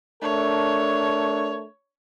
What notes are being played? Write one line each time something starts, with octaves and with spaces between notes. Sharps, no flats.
A3 D4 A#4 C#5